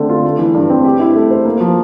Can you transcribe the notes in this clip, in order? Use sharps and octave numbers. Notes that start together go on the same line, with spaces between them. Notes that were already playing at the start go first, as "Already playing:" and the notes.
Already playing: D3 A3 C4
F4
A3
E3
G2
C4
G4
E4
A3
C5
A#3
F3